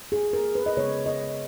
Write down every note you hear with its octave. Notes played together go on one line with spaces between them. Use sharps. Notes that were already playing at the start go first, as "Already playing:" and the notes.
G#4
A#4
B4
D#5
C#3 G#3 B3 C#5
D#5